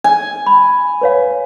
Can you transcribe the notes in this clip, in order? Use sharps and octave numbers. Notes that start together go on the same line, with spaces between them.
G#5
B5
B4 C#5 F5